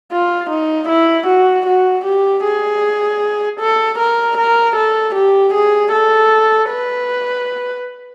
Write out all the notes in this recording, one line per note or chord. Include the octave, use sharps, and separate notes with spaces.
F4
D#4
E4
F#4
F#4
G4
G#4
A4
A#4
A#4
A4
G4
G#4
A4
B4